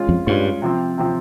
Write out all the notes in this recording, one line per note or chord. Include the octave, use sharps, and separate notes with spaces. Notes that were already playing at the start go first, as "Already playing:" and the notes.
Already playing: G#3 C#4 F4
F2
G2 G#3 C#4 F4
C3 F3 C4
C3 F3 C4